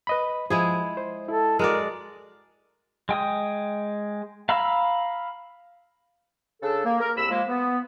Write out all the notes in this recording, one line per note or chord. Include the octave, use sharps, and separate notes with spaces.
B4 D#5 B5
F3 G#3 E4 G#4
C5
E4 A4
G#3 F#4 A#4 D5
G#3 G5 D#6
F5 A#5 B5 E6
C#3 D4 A4
A#3
A#4
C2 B5 E6
F3 G#3 A#3
B3